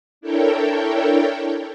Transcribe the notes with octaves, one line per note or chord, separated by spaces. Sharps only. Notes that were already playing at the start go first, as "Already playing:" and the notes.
D4 E4 A4 A#4 C#5 G5